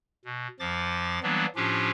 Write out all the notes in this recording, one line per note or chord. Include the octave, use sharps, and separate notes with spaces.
B2
F2 F3 D6 A6
E3 F#3 G3 A#3 B3 D4
A2 F3 C#4 D4 F4 G4